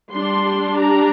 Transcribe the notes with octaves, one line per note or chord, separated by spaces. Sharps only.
G3 D4 C6
A#5